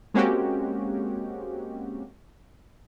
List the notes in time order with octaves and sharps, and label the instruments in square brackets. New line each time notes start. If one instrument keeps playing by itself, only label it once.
[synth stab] G#3 A#3 C4 C#4 F#4 G4